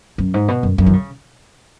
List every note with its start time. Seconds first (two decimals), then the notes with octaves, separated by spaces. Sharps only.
0.18 F#2
0.34 G#2
0.48 B2
0.63 F#2
0.78 F#2
0.86 E3
0.93 C#3